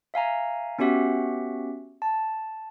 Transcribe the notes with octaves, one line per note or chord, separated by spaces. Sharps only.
E5 F5 G#5 A#5
B3 C#4 F#4 G4 E5 F#5
A5